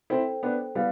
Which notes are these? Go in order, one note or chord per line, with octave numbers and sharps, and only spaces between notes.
C4 E4 A4 C5 G5
B3 D4
G3 B3 E4 B4 F5